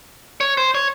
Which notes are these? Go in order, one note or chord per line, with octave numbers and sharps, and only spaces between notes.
C#5
C5
C#5